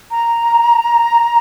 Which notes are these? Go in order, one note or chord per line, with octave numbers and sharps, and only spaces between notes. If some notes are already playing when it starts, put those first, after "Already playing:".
A#5